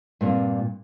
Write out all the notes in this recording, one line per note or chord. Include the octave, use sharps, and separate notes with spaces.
G2 A#2 C4